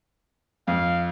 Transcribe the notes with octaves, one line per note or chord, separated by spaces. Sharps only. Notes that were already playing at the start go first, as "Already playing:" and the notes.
F2 F5